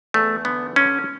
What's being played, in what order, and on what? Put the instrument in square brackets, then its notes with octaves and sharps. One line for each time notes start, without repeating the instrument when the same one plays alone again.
[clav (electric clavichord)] E2 A3
D3 B3
D3 C#4